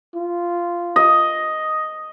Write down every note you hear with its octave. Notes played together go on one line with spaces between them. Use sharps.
F4
D#5